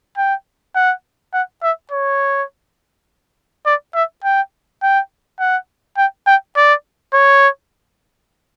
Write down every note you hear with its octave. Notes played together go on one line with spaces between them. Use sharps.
G5
F#5
F#5
E5
C#5
D5
E5
G5
G5
F#5
G5
G5
D5
C#5